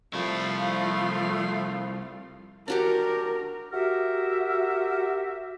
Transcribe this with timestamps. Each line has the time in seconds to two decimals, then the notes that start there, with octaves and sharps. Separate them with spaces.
0.13 C2 F3 A3 E4 F4 F5
2.68 D4 F#4 G4 A#4
3.73 F#4 G4 A#4 E5